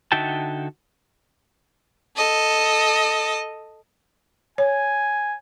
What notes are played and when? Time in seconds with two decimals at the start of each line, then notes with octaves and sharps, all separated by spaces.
0.12 D3 D#4 F#4 E5 G5 A5
2.17 A4 D#5
4.58 C#5 G#5